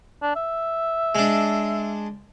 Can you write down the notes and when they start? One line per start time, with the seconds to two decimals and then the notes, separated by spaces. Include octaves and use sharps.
0.22 D4
0.36 E5
1.15 G#3 D4